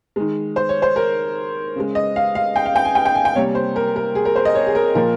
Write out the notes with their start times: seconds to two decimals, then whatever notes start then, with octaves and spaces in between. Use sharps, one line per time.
0.16 D#3 G#3
0.56 C5
0.69 C#5
0.82 C5
0.96 A#4
1.76 C#3 G#3
1.95 D#5
2.16 F5
2.35 F5
2.56 G5
2.66 F5
2.76 G5
2.85 G#5
2.95 G5
3.06 G5
3.15 G#5
3.25 G5
3.35 C3 G3 A#3 C#5
3.55 C5
3.76 A#4
3.96 A#4
4.15 G#4
4.25 A#4
4.36 C5
4.45 D#5
4.55 C#5
4.67 G#4
4.75 A#4
4.95 A#2 F3 A#3 A#4